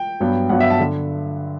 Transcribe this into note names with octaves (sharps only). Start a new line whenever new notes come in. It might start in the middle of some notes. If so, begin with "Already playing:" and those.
Already playing: G5
G2 F#3 B3
G2 F#3 B3 F#5
E5
A5
D3